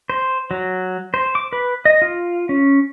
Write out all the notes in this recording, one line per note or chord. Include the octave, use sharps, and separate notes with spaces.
C5
F#3
C5
D6
B4
D#5
F4
C#4